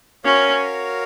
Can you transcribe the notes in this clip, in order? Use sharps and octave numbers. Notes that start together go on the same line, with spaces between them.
C#4 F#4 A#4 C#5 F5